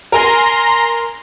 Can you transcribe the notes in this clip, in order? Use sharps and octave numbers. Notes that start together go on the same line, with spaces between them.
A#4 G#5 A#5 C6